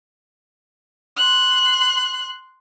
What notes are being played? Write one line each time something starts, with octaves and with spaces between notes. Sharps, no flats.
C6 F#6